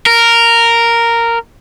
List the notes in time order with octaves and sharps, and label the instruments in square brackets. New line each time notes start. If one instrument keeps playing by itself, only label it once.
[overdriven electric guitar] A#4